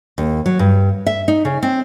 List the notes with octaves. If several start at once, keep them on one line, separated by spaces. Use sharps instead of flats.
D#2
F#3
G2
E5
D#4
C#3
C4